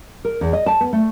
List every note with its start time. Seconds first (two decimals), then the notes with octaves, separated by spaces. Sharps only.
0.25 A#4
0.41 E2
0.53 D#5
0.66 A5
0.81 B3
0.93 A3